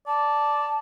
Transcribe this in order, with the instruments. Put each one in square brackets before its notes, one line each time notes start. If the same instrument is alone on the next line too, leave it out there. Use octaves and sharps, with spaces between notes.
[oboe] D5 [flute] A5